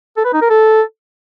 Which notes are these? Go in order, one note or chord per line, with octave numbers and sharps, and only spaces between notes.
A4
B4
D#4
A#4
A4